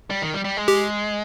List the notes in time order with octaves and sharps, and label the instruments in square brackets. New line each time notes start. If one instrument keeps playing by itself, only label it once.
[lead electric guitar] G3
D#3
G3
G3
G#3
[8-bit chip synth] G4